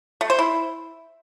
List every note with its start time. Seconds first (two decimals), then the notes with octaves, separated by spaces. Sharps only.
0.21 A3
0.30 C5
0.39 E4